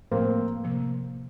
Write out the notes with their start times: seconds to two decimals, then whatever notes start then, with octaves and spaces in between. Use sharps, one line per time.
0.12 A2 F3 A3 A#3 C4
0.64 C3 F3 A#3